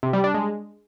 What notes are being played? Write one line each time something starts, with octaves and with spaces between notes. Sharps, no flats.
C3
G3
D4
G#3